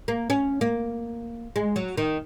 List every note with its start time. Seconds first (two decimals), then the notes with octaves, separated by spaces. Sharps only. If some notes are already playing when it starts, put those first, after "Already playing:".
0.08 A#3
0.30 C#4
0.61 A#3
1.56 G#3
1.76 F#3
1.97 D#3